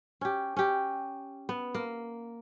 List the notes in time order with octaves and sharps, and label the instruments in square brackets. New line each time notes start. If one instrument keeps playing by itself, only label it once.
[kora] C#4 G4
C#4 G4
B3
A#3